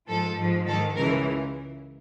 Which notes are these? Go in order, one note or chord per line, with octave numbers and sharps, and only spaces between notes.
G#2 F3 A4
G#2 F3
G#2 D#3 A4
C#2 C#3 E3 A#4